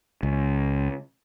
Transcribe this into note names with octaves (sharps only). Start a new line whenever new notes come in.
C#2